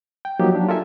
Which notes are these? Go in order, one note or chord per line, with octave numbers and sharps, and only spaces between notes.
G5
F3 F#3 A#3 D#4 G4
F#3 D4
F4 A4 A#4 E5 G#5